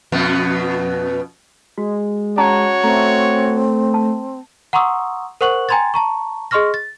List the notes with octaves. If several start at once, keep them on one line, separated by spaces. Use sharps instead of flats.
F2 B2 B3
G#3 F#4
C#4 F#4 C#5 A5 A#5
A3 C4 A#5
A5
F#5 A#5 C6 C#6 D#6 E6
A#4 C5 F#5 C#6 F#6 F#7
G5 G#5 A#5 C6 G#6 A6
A5 A#5 C#6
G#4 D#5 C6 C#6 F6 A#6
A6